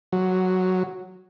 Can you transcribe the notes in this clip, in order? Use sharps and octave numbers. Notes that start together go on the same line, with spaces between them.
F#3